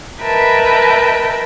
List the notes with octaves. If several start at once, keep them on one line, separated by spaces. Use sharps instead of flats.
A#4 B4 D#5 E5 G5 A5